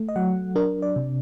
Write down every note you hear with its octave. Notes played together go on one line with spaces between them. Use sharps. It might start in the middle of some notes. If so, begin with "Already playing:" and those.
Already playing: A3
D#5
F#3 F#5
D4 A#4
D5
C3